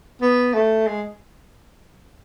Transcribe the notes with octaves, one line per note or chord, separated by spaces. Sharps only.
B3
A3
G#3